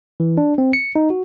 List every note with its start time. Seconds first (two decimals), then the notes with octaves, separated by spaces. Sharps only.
0.20 E3
0.37 D4
0.58 C4
0.73 C#7
0.96 D#4
1.10 F#4